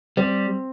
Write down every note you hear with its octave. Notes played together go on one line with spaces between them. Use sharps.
G3 C4